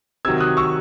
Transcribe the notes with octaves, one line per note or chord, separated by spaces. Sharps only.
C3 D#3 F#3 E6 G#6
D#6 F#6
C#6 E6